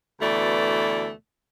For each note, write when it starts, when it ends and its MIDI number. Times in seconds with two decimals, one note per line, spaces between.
0.21 1.11 38
0.21 1.11 47
0.21 1.11 52
0.21 1.11 57
0.21 1.11 74